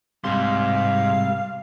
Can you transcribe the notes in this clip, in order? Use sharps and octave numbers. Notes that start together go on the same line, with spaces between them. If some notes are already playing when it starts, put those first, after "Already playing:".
C2 G#2 C3 G3 F5 C6